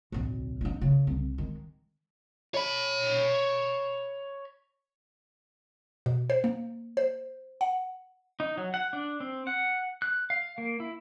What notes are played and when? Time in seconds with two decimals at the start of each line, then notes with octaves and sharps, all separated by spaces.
0.12 D1 B1
0.61 A#1 D#4
0.81 C#3
1.07 C2
1.38 D#3 G#3
2.54 C#5 B5
6.06 B2
6.30 C5
6.44 A#3
6.97 C5
7.61 F#5
8.40 D#4
8.57 F#3
8.74 F#5
8.93 D4
9.20 C4
9.47 F#5
10.02 F#6
10.30 F5
10.58 A#3
10.80 E4